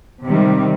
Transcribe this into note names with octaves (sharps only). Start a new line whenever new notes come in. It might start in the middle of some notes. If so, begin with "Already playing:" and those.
C3 D#3 G3